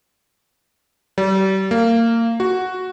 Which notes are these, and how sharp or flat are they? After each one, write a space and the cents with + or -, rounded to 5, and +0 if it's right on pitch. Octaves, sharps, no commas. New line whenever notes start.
G3 -35
A#3 -25
F#4 +0